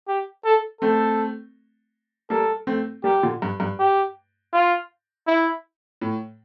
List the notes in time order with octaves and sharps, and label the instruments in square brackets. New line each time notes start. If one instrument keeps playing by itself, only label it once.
[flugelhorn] G4
A4
[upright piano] A3 C4 [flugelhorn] A4
[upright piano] G3 A#3 [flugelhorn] A4
[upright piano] A3 C4
[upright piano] G3 A#3 [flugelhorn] G4
[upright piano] A#2 D3
G2
G2
[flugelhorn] G4
F4
E4
[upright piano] A2